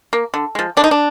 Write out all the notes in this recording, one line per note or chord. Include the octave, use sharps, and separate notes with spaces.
A#3
D3
F3 G#3
D3 D4
D#4
D4